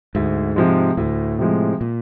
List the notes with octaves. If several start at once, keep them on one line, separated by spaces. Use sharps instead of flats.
D2 G#2
C3 F3 G#3
D2 A2
C3 F3 G#3
A#2